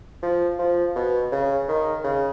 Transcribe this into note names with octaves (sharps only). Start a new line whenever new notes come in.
F3
F3
B2
C#3
D#3
C#3